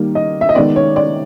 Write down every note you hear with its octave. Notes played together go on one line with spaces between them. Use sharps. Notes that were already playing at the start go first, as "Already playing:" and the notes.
Already playing: D#3 G3 A#3
D#5
E5
D#5
D#3 G#3 B3 D5
C#5
D5